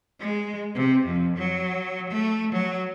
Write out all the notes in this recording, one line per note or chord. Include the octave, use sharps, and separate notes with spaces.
G#3
C3
F2
F#3
A3
F#3